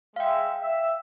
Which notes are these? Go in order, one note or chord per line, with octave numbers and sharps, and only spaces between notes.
G#3 E5 F5 G5
E5